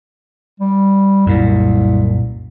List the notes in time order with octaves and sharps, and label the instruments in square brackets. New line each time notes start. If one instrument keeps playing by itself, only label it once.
[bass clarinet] G3
[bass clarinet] C2 [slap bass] F#2 A#2